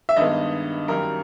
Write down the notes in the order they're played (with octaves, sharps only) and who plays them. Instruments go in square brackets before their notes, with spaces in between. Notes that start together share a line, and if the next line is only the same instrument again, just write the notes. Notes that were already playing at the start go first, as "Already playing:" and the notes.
[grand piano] E5
G2 D#3 G#3 B3 D#5
G#1 F#2 D#3 G3 A#4